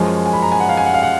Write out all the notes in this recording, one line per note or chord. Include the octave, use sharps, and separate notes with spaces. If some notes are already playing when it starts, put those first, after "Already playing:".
Already playing: F#2 F3 G#3 C#4
G#5
B5
A#5
G#5
F#5
F5
G#5
F#5
F5
F#5